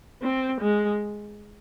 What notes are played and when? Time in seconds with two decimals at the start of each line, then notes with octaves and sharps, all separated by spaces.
0.22 C4
0.61 G#3